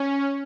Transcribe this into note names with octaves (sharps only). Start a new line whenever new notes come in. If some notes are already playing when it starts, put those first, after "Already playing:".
Already playing: C#4